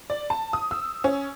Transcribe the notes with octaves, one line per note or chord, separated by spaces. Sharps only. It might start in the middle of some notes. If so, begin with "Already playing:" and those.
D5
A5
D#6
E6
C#4